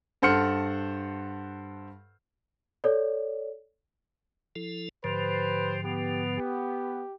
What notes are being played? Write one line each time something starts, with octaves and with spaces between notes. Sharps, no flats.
G2 A4 C5 F#5 F6 C#7
A4 C#5 D5
F3 E4 A4
G#2 D3 F3 G4 B4 C5
B3 G4
G4